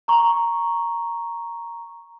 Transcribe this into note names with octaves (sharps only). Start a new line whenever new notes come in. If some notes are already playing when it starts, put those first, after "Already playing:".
A#5 C#6